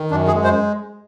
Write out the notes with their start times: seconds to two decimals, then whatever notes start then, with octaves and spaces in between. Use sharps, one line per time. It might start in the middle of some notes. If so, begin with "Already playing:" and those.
Already playing: D#3
0.11 F#2 D4
0.27 G#4
0.33 G#3
0.44 C5